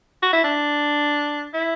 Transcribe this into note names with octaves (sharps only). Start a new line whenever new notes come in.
F#4
E4
D4
E4